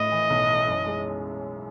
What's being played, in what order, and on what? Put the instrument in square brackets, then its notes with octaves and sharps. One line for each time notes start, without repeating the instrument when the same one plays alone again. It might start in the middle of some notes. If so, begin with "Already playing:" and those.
Already playing: [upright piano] A2 [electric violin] D#5
[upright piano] E3
B1
E3
F#2
G#3